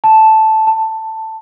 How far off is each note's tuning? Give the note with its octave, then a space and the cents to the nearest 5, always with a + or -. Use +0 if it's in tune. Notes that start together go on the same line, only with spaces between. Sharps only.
A5 -5
A5 +10